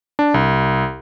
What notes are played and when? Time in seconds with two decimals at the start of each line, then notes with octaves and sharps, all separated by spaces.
0.19 D4
0.34 C2